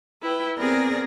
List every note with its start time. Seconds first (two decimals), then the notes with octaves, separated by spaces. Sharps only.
0.20 E4 B4 G5
0.57 B3 C4 G#4 A#4 D5 A#6